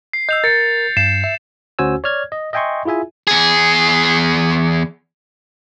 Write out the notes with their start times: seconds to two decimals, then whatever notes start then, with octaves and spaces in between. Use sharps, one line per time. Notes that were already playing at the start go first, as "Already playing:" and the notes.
0.13 C7
0.29 D#5 E6 G6 F7
0.44 A#4 A6 C#7
0.97 G2 C7 E7
1.24 E5
1.79 D2 C#4 F#4 C5 G#5 E6
2.04 C#5 D5 F6 G#6
2.32 D#5
2.53 D#5 E5 G5 G#5 C6 C#6
2.85 E4 F4 G#4 E5 G#5
3.27 E2 G#4